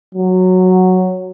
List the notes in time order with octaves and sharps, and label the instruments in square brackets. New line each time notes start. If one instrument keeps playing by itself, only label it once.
[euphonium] F#3